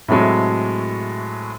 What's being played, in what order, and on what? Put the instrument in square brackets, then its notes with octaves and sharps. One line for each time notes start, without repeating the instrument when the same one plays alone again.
[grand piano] A2 C3 F#3 G#3 A3